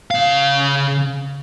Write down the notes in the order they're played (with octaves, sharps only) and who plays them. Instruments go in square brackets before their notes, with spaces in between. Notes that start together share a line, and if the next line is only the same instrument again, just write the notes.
[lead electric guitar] C#3 F5